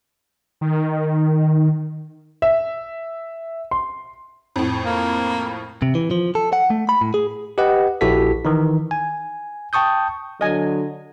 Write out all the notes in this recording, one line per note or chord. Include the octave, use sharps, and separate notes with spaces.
D#3
E5
C6
F2 A2
A#3
C3
E3
F3
A4
F#5
A3
B5
A2
G#4
G4 B4 D#5 F#5
A#1 E4 F#4 G4 A4 B6
D#3 E3 D#4
G#5
G5 A5 C#6 D#6 G6
D3 F#3 D#5 G#5